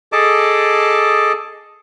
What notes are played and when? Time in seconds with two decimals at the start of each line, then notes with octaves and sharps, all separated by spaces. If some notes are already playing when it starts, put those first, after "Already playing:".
0.12 G#4 A4 D#5 A5 D6